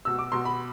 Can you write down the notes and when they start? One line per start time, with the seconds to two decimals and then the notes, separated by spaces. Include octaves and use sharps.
0.05 B2 E6
0.19 D6
0.32 B2 C6
0.45 B5